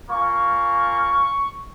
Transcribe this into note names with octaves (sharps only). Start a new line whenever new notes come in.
A#3 C#4 F4 C#6